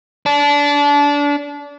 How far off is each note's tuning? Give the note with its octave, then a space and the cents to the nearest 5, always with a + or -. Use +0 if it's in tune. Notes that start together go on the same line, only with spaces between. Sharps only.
D4 -25